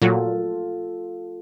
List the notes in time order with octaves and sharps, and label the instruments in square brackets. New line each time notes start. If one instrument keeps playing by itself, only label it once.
[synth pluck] A#2 F#3 F#4 [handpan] F4 A4